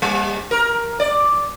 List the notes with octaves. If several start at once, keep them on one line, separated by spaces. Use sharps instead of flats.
G3
A#4
D5